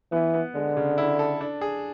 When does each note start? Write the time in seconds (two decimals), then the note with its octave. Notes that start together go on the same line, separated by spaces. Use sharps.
0.12 E3 B3
0.34 B3
0.55 D3 G#3
0.77 C#3
0.98 E4
1.19 A4
1.41 D4
1.61 G#4